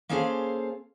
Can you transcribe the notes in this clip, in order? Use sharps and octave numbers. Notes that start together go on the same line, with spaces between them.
A#3 C#4 G#4 A4 C5 F5